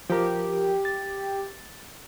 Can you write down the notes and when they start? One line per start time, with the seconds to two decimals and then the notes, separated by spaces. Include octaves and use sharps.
0.10 F3 G4 A#4
0.85 A6